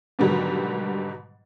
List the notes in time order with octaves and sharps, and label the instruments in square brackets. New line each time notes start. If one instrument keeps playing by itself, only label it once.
[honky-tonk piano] G#2 B2 D3 D#3 F#3 G3